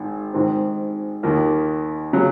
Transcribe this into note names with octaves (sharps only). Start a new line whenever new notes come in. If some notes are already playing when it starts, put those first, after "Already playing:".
Already playing: G#1 D#3
G#2 D#3 G#3 C4
D#2 D#3 A#3 F4
C#3 F#3